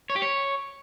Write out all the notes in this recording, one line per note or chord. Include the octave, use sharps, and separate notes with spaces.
C#5
G4
C#5